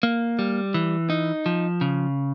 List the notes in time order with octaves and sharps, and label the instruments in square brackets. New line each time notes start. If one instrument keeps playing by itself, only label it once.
[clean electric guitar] A#3
G3
E3
D#4
F3
C#3